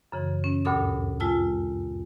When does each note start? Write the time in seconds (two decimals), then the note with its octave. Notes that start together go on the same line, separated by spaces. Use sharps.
0.12 F#2 C#3 E3
0.44 C#4
0.65 D2 G2 A#2 A4 D6 D#6
1.20 G#3 F4 A5 E6